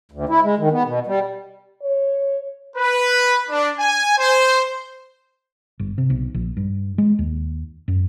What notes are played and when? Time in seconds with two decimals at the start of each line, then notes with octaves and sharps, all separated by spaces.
0.12 D2
0.29 E4
0.43 G#3
0.58 D#3
0.72 B3
0.85 B2
1.07 G3
1.82 C#5
2.77 B4
3.49 D4
3.79 G#5
4.19 C5
5.79 G1
5.98 C3
6.10 B1
6.34 A#1
6.57 G2
6.98 G#3
7.19 D#2
7.88 F#2